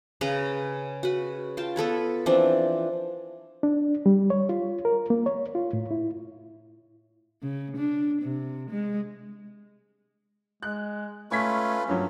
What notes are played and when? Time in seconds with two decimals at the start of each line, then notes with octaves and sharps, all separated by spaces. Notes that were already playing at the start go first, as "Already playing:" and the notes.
0.21 C#3 C#4 B4 A#5
1.03 F#4 B4
1.57 F4 G5 A5
1.76 B3 A4 B4 C#5
2.26 E3 F3 C4 D4
3.63 D4
4.06 G3
4.30 C#5
4.49 F4
4.85 A#4
5.10 A#3
5.26 C#5
5.55 F4
5.73 A2
5.91 E4
7.43 C#3
7.77 D4
8.22 C3
8.70 G#3
10.63 G#3 F#6
11.31 A3 C#4 F4 B4 C#6 G#6 B6
11.88 G2 F3 F#3 A#3 C#4